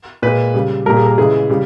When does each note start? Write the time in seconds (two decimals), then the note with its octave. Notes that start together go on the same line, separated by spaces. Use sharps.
0.22 A#2 G#3 B4
0.54 C#3 G3
0.86 A#2 G3 A#4
0.97 G#4
1.06 A#4
1.18 C#3 E3 G#3 G#4
1.50 C#3 G3